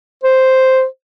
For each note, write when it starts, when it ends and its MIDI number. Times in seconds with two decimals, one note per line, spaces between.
0.24 0.85 72